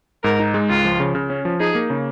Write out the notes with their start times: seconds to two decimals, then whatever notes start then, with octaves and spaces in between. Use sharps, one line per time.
0.24 G#2 A#4
0.39 D#4
0.54 G#3
0.69 C#2 F4
0.85 F3
1.00 C#3
1.15 C#3
1.30 C#4
1.45 F3
1.60 D#4 G#4
1.75 A#3
1.90 C#3